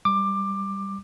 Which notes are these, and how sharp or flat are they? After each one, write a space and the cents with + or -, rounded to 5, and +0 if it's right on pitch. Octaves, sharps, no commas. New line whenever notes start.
G3 +0 D6 +15